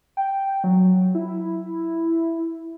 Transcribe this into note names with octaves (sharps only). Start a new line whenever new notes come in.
G5
F#3
E4